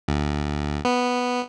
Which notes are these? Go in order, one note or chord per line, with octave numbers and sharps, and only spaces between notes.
D2
B3